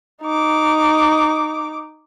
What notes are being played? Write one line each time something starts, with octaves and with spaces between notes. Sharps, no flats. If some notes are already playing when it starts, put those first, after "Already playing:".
D#4 D6